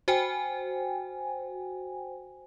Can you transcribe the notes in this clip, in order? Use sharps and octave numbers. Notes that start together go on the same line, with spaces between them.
F#4 C5 G5 G#5